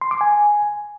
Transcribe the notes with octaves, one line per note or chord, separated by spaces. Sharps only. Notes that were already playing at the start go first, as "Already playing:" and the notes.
C6
D6
G#5